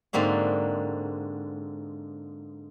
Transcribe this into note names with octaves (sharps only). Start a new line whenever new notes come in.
G#2 D3 A#3 C4 F#4